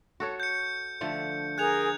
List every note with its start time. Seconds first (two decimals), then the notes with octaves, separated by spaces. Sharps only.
0.20 F#4 A4 C#5
0.40 G6 C#7
1.01 D3 F3 A3
1.58 G#4 A#4 G#5 F#6 G#6 F7